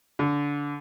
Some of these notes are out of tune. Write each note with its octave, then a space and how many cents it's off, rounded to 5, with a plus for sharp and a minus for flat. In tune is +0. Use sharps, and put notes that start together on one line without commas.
D3 -20